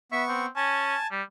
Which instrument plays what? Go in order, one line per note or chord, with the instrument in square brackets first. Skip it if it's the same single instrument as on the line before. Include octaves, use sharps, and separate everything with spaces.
[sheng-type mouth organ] B3 C#6 [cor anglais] E5
[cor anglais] C4
[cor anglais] C#4 [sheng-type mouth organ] G#5 A5
[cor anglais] G3